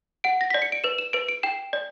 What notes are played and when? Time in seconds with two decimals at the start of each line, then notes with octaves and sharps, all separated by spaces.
0.24 F#5 D7
0.41 A#6
0.50 D5 B6
0.62 C#7
0.72 D7
0.84 B4 E7
0.98 E7
1.13 B4 D7
1.28 D7
1.43 G5 E7
1.73 D5